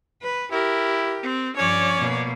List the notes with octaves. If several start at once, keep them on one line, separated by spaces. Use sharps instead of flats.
B4
E4 G4 A#4
C4
G2 F3 C#4 C#5 D5
B2 A#3